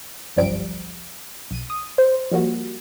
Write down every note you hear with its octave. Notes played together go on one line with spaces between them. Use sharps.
G1 C2 F#2 F3 G3 D7
B1 D#7
D#6
C5
F3 G3 A#3 F#4